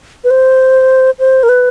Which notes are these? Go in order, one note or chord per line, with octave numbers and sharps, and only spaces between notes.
B4
C5
C5
A#4
B4